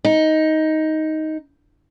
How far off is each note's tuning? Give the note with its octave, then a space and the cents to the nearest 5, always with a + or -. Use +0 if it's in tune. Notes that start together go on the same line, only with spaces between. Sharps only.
D#4 +10